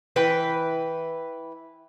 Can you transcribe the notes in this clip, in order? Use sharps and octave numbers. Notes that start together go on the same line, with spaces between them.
E3 B4 G5